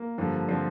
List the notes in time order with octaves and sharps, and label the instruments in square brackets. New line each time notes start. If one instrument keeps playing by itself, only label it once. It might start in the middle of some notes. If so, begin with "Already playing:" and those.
Already playing: [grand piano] A#3
G2 D3 F3
D3 F3 C4